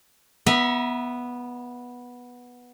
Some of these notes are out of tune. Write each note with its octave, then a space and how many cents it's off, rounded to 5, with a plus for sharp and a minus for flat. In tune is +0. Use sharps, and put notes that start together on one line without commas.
B3 -10 E5 +0 A#5 +45